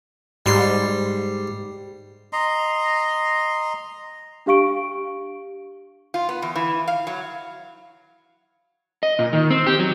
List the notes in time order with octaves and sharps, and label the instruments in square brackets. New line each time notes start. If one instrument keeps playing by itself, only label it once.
[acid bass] G#2 [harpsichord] G3 C6
[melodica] D#5 A#5 C6
[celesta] D4 G4 F5 C#6 D7
[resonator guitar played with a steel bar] F4
B3
E2
E3
F5
F#3
[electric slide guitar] D#5
A#2
D#3
C4
G4
F#3